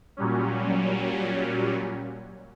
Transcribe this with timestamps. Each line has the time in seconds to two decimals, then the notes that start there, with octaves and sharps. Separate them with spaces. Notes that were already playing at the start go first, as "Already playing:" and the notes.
0.17 A#2 F#3 G3 C#4